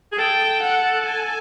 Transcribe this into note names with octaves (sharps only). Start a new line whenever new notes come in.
G#4
A4 G5
F#5
G#5